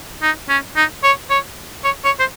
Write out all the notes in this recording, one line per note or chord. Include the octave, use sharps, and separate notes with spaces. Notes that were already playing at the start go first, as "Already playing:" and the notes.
D#4
C#4
D#4
C#5
C#5
C#5
C#5
C5